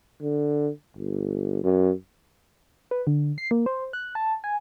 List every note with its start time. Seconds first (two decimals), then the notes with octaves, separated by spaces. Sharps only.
0.22 D3
0.97 G1
1.64 F#2
2.91 B4
3.07 D3
3.38 C7
3.51 A#3
3.66 C5
3.93 F#6
4.15 A5
4.44 G#5